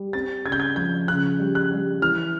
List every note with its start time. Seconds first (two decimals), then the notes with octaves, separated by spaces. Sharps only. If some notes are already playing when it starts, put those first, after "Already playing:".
Already playing: G3
0.13 C4 A6
0.45 C#3 G#6
0.52 G6
0.60 G#6
0.76 F3 G6
1.08 C#3 F#6
1.39 G3
1.55 F#6
1.71 G3
2.01 E3 F6